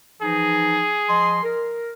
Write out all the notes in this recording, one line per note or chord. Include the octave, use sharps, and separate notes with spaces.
E3 F3 D#4 G#4
F3 D#5 C6
A#4